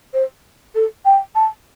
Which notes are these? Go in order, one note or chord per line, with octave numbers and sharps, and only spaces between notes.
C5
A4
G5
A5